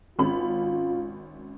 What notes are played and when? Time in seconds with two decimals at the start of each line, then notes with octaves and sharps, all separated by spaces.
0.19 G#1 C#4 F4 B5